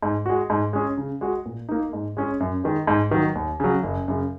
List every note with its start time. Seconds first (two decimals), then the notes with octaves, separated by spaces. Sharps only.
0.03 G#2
0.26 G#3 F#4
0.50 G#2
0.73 G#3 C#4 G#4
0.98 C#3
1.21 G#3 F#4
1.46 A#2
1.69 A#3 D#4
1.93 G#2
2.17 G#3 C#4 G#4
2.40 F#2
2.64 D#3 G#3
2.87 G#2
3.11 D#3 F#3
3.35 D#2
3.60 C#3 F#3
3.83 F#1
4.08 F#2 C#3